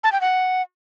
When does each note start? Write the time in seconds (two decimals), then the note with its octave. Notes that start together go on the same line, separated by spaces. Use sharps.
0.04 A5
0.12 G5
0.21 F#5